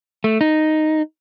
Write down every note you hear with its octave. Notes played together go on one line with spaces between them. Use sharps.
A3
D#4